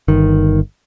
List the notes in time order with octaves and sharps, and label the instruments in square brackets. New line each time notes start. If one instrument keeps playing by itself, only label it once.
[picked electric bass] G1 D#3